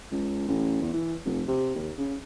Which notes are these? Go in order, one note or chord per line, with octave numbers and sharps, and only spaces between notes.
C#2
A1
E2
E3
F1
C3
D#2
C#3